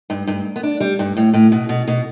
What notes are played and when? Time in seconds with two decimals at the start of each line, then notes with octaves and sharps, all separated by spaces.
0.10 G2
0.27 G2
0.56 B3
0.63 D4
0.80 G3
0.99 G2
1.17 A2
1.34 A2
1.52 B2
1.69 B2
1.87 B2